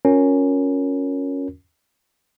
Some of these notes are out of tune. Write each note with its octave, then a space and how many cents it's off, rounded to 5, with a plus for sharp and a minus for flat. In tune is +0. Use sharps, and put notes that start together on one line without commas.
C#4 +0 F4 +45 A#4 +0